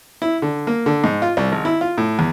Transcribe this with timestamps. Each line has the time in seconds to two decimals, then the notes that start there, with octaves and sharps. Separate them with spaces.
0.22 E4
0.42 D3
0.67 A#3
0.86 D3
1.04 G#2
1.22 F4
1.37 C2
1.52 G#1
1.65 E4
1.81 F4
1.98 A2
2.19 E2